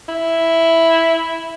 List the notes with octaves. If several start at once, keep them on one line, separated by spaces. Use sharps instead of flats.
E4